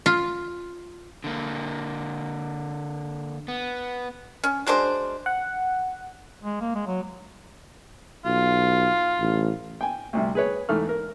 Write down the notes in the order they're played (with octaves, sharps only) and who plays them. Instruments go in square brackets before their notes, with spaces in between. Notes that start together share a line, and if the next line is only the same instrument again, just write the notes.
[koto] F4
[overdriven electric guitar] D3 A#3
B3
[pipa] C#4
F#3 G#3 D4 C5
[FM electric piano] F#5
[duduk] G#3
A#3
G#3
F#3
[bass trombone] B1 [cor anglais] F4
[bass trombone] A1
[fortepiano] G5 G#5
D2 C3 G3
G#4 B4 C#5
E2 G#2 A3 F6
A#4